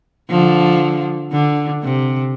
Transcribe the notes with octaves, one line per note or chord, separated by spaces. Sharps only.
D3 F3
D3
C3